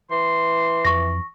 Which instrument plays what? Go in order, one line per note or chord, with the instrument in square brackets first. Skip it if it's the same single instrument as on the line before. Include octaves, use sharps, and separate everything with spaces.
[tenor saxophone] E3 [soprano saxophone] C6
[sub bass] F2 [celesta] C#6 A#6